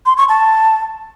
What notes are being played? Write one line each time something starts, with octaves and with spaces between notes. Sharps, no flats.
C6
C#6
A5